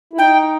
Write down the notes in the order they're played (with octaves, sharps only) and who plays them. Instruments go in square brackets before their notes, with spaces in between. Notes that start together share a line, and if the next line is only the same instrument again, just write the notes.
[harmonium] E4
[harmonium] D#4 [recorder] G5